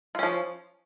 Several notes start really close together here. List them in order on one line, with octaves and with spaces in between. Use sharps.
F4 C#4 F3